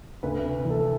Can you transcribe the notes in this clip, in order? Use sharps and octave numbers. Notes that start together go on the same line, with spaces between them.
D2 B4
C3 B4
E3
A4